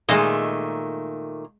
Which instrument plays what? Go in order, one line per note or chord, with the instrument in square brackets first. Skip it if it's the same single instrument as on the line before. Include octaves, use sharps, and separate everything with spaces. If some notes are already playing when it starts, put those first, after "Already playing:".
[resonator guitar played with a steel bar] A#2 D#3 A3 [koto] G#3 C5 D#5